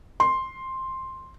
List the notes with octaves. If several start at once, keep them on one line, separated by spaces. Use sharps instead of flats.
C6